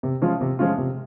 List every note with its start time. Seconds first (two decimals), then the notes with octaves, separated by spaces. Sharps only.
0.03 C3
0.22 F3 G#3 C#4 F4
0.41 C3
0.59 F3 G#3 C#4 F4
0.78 C3